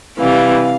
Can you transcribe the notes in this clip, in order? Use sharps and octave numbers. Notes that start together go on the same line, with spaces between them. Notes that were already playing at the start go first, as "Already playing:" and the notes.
C3 E3 G3 F5